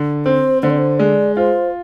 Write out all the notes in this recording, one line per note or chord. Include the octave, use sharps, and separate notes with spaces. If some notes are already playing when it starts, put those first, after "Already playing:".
Already playing: D3
C4 C5
D3 C5
D5
C5
G#3 D5
F4 C5